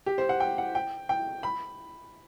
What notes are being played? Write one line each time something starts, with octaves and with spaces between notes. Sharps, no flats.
G4
C5
F#5
G5
F#5
G5
G5
B5